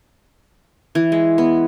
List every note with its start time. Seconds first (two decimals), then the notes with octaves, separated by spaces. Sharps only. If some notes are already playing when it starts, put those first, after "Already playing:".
0.95 E3
1.12 G#3
1.38 B3